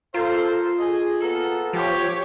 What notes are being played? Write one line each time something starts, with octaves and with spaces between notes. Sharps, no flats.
A#3 F4 A4 C5
G#4 D#5
A#3 B3 A4
F3 G4 C#5